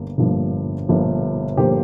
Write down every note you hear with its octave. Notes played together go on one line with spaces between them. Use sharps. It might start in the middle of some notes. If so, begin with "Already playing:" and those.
Already playing: G1 G2 A#3
G1 G2 F3 A#3
G1 G2 F3 A#3
G1 F3 A#3 G4 C5